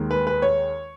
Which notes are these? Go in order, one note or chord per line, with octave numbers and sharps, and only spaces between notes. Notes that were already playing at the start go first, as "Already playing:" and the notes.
Already playing: D#2 D#3 G#3
B4
B4
C#5